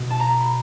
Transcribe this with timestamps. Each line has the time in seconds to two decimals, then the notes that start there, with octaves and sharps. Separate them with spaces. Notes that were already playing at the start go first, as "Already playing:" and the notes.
Already playing: B2
0.10 A5
0.20 A#5
0.40 B5